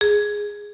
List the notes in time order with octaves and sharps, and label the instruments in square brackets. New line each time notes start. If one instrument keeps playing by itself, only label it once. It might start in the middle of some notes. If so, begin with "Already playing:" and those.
[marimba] G#4